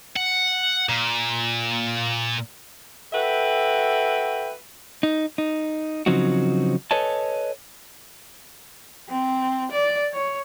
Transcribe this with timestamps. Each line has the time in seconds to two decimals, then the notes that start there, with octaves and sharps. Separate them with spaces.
0.16 F#5
0.89 A#2
3.13 F#4 A4 B4 E5 G5
5.03 D#4
5.38 D#4
6.06 C#3 F3 F#3 C4 D#4 F#4
6.91 A4 B4 C#5 D#5 G#5 A5
9.09 C4
9.71 D5
10.13 C#5